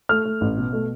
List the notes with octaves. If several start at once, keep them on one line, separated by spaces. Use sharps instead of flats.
A3 F6
A3
A1
B2
A3